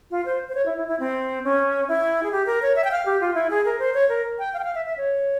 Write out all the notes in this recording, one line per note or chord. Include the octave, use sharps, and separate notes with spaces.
F4
C5
C5
C#5
E4
E4
E4
C4
C#4
E4
G#4
G4
A#4
C#5
E5
G5
F5
G4
F4
E4
G#4
A#4
C5
C#5
A#4
G5
F5
G5
F5
E5
E5
C#5